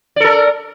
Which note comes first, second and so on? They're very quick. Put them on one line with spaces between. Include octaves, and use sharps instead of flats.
D5 A4 A#4